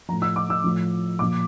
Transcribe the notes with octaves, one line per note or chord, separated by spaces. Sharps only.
A2 F3 A#5
E6
D6
E6
A2 F3
A#2 F3 D6